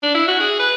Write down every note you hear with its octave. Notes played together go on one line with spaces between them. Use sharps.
D4
E4
F#4
G#4
B4